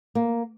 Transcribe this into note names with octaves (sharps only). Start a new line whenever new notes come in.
A#3